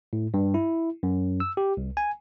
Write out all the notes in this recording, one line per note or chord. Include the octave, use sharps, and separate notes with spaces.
A2
G2
E4
F#2
E6
G4
C2
G#5